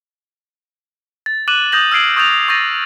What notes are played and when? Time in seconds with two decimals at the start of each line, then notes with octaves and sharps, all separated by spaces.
1.26 A6
1.48 D6 F#6 D#7 E7 F#7
1.72 D#6 F#6 G6 A#6 F#7
1.92 E6 F6 G#6 C7 D7 F#7
2.17 C#6 D#6 G6 A6 F7
2.48 C#6 G6 A6 A#6 D#7